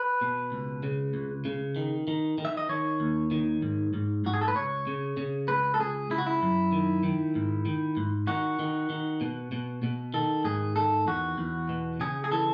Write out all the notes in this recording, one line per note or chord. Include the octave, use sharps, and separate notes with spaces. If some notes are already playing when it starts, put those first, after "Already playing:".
Already playing: B4
B2
C#2
C#3
C#2
C#3
D#3
D#3
D#3
E5
D#5
D#3 C#5
D#2
D#3
G#2
G#2
G#2 F#4
G#4
A4
B4
C#2 C#5
C#3
C#3
C#2 B4
A4
C#2 G#4
C#2 E4
F#4
E4
F#2
D#3
D#3
G#2
D#3
G#2
D#3 F#4
D#3
D#3
B2
B2
B2
D#3 A4
G#2 G#4
D#3 A4
E2 F#4
E2
B2
C#3 G#4
G#4
E3 A4